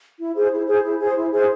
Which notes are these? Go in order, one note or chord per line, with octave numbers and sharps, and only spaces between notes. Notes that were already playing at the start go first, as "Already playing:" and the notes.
E4
G#4 C5
E4
G#4 C5
E4
G#4 C5
E4
G#4 C5